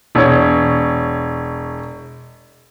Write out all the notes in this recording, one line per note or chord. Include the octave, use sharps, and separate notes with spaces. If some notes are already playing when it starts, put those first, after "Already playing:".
E1 C#5